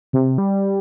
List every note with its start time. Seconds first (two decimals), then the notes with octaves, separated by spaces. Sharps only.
0.13 C3
0.38 G3